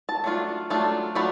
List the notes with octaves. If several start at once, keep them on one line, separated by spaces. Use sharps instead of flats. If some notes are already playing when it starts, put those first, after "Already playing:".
A5
F#3 A3 D4 F4
F#3 A3 D4 F4
F#3 A3 D4 F4 B5